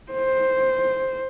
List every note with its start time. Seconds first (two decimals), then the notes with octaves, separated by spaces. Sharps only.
0.12 C5